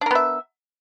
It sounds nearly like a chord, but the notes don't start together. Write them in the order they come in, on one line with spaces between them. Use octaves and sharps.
D4 A#4 B3 E5